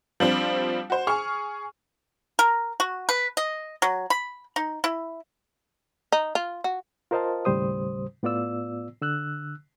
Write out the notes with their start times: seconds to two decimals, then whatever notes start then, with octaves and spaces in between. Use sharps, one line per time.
0.20 F3 G3 C4 D4
0.90 F#4 C5
1.07 G#4 C#6 F6
2.39 A#4
2.80 F#4
3.09 B4
3.37 D#5
3.82 F#3
4.10 B5
4.56 D#4
4.84 E4
6.12 D#4
6.35 F4
6.64 F#4
7.11 F4 A#4 C5 D#5 F5 A5
7.45 D#2 A2 C#3 G3 C5 D#6
8.23 A2 B3 F4 D5 E6
9.02 D3 E6 F#6